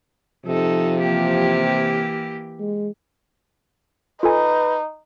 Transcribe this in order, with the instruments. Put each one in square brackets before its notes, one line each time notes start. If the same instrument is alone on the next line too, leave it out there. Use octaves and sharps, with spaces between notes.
[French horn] C3 [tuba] F3 [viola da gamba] D#4 A4
[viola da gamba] E3 A#3 G4
[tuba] G#3
[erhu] D#4 [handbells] F4 A4 G#5 [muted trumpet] B4